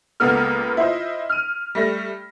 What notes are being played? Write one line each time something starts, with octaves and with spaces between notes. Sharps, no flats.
C#2 G#3 A#3 B3 A4 F6
E4 F4 C5 D#5
F6 D#7
G3 A3 A#6